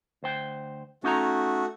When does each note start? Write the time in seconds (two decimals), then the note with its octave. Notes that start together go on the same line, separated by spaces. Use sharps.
0.23 D2 C5 G5
1.04 A3 C#4 D#4 F#4 A#5